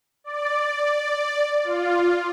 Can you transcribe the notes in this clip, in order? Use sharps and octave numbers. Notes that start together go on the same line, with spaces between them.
D5
F4